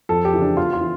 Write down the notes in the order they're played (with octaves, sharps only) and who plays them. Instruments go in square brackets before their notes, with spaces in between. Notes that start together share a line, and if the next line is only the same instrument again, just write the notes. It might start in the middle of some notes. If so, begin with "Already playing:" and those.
[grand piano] F2 A4
G4
C#3 E3
D4
E2 F4
F4
E3